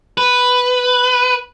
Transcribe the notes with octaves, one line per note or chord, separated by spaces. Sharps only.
B4